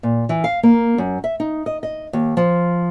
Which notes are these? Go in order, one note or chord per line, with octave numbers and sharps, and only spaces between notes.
A#2
E3
F5
A#3
F#2
E5
D#4
D#5
D#5
D#2
F3